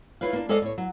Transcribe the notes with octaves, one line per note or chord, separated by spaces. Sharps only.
E4 F4 B4 C#5 F5
A#3 D4
G#3 A4 C5 D5 D#5 F5
A2 C#5
F#3